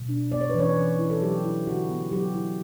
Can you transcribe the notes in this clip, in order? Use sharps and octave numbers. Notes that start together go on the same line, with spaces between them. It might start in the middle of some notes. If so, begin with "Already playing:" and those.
Already playing: B2
D4
B3 D5
C#5
B4
E3 C#4 C#5
E3
E4
A4
F#3 G4
E4
D3 F#4
B3
F#3 G4
E4